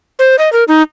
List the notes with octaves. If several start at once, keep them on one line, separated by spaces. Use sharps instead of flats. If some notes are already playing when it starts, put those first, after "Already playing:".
C5
D#5
A#4
D#4